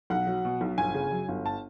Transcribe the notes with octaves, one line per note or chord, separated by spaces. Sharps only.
B1 F#5
F#3
B2
B1
G1 G#5
C#3
F#2
G1
A5